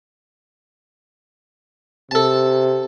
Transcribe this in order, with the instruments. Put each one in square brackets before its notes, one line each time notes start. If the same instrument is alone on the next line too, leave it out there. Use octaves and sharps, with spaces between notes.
[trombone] C3 [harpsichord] A4 A5